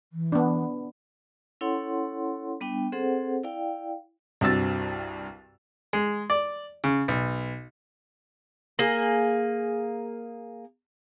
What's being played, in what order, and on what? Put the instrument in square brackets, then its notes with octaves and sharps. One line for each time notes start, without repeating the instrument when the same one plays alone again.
[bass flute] E3
[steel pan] B3 D4
[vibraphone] C#4 E4 A4 C#5 F#5 C6
G3 B3 D4 G5
C4 G#4 A4 C5 F#5
E4 D5 F5 G5
[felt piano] C2 G2 C4 F#4 E6 A6
[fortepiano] G#3
D5
C#3
B1
[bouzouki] A#3 G#4